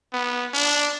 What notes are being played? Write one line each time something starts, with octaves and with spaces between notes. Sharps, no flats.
B3
D4